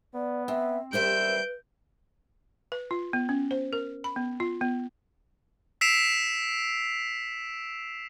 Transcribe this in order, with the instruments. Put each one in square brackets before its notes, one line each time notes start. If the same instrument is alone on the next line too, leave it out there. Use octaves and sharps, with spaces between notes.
[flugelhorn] B3 [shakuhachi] D5
[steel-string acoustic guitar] C4 [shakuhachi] E5
[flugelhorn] G3 [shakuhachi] G4 [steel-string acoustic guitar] A#4 C5 E5 [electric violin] G6 D7
[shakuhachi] B4
[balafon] B4
F4
B3
C#4
C5
A#4
B5
B3
F4
B3
[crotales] E6 B6 C7 D7 E7 F7